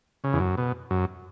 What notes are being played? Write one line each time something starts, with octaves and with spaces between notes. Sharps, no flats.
C#3
E2
F#2
B2
F#2